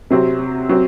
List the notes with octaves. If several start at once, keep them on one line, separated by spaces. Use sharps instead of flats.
C3 F#3 C4
F#3 C4